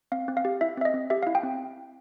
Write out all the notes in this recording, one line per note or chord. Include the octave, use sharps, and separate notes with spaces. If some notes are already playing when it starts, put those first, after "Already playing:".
C4 F5
C4
F5
G4
E4 E5
C4 E5
D#5
C4
G4 E5
E4 F5
G5
C4